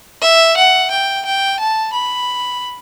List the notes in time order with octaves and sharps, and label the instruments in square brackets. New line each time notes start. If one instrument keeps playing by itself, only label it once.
[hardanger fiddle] E5
F#5
G5
G5
A5
B5